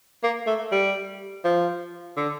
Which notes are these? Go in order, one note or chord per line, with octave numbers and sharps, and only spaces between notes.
A#3
A3
G3
F3
D3